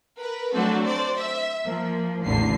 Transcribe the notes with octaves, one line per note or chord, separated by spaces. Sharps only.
A#4 B4
F#3 A3 C4 D4 F#4 A4
C5 D5
E5
F3 A#3
A1 E2 D3 E3 C7